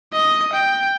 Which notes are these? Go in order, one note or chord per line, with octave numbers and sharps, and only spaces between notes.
D#5
G5